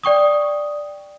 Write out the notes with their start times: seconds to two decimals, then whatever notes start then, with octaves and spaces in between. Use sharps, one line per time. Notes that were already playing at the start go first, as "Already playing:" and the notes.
0.04 D5 G5 C#6 D#6